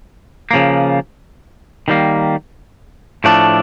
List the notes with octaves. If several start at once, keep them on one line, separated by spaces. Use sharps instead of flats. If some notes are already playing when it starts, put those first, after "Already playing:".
C#3 F3 A#3
D#3 G3 A#3
A2 F3 A3 D4